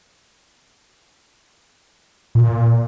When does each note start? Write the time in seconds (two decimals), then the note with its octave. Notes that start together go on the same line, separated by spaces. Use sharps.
2.35 A#2